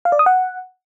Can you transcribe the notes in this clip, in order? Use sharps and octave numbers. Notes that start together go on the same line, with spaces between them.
F5
D5
D#6
F#5